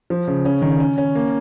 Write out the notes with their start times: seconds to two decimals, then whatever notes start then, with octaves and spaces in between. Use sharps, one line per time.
0.10 F3
0.27 C#3
0.45 C#4
0.62 D#3
0.80 C#4
0.98 C#4
1.15 A#3